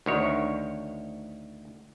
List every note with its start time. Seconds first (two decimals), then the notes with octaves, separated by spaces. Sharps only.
0.06 D2 D#3 C#5